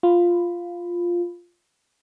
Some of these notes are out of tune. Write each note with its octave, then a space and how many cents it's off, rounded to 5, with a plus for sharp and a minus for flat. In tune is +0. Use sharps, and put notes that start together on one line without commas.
F4 +0 B5 +10